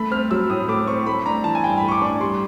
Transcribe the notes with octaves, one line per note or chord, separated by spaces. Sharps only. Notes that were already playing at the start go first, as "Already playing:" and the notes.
Already playing: A3 B5
C4 F6
F#3 E6
A2 D#6
A3 D6
C4 C#6
A3 B5
D4 A#5
E3 A5
G#5
G2 G5
B5
A3
C#6
D6
D4 C#6
G3 C6